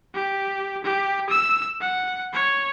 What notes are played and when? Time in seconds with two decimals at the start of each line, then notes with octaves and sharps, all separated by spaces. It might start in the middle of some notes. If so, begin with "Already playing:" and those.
0.14 G4
0.84 G4
1.29 E6
1.81 F#5
2.33 C#5